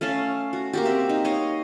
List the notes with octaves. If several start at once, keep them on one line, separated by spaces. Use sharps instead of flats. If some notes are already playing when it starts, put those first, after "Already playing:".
A3 C#4 F5 A5
F#4
A#3 F#4 G4
C4 E5
D#4
C#5 D#5 F5